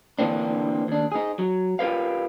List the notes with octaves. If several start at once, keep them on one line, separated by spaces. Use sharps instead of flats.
D3 E3 A#3 C4 D4
D#2 D4
D#4 G#4
F#3
F4 G4 A#4 B4 F5